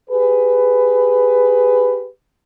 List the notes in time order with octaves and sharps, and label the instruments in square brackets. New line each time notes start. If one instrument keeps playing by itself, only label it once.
[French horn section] G4 G#4 B4